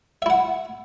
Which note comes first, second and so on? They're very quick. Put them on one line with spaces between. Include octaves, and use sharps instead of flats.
E5 E4 F#5